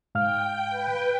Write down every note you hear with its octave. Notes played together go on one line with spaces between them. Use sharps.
G#2 F5 G5 F6
B4 G5